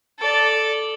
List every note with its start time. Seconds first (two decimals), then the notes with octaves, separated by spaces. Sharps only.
0.18 A4 D5